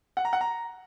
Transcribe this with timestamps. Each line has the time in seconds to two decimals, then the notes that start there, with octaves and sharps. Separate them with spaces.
0.17 F#5
0.25 A#5
0.33 F#5
0.41 A#5